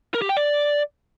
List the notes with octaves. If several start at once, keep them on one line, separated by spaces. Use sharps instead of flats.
A#4
G4
G5
D5